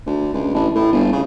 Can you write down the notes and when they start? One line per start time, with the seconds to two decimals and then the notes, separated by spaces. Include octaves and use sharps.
0.06 D2
0.34 C#2
0.54 A1
0.75 A2
0.92 G1
1.13 C#3